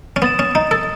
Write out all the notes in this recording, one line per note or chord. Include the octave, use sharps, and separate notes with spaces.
C#4
B3 D#6 A6 E7
C#4
D#4
A4